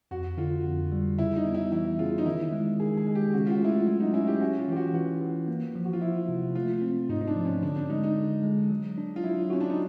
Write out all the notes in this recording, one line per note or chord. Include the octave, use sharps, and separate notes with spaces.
F2 F#4
D3 F4
F2
G3
C#3 E4
D#4
B3
E4
E3 E4
C#3 F4
D#4
D#3 E4
G#3
D#3 G#4
G#4
G#3
G4
C#4 F#4
F4
F#4
A3 E4
F4
F#3 E4
D#4
C#4 E4
G4
C#4 F#4
F4
E3 G4
F#4
E3 F#4
E3
A#3
F3
F#4
F4
F3 E4
C3
A3 F4
C4
G#2 D#4
D#4
D4
F3
C#4
D3 D4
D4
G#3 D#4
D#4
D3
G#3
F#3
D4
F4
F#3 E4
C#4 F#4
D4
D#4